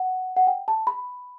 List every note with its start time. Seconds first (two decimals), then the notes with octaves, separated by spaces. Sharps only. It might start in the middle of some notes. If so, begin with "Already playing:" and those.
Already playing: F#5
0.37 F#5
0.47 G5
0.68 A5
0.87 B5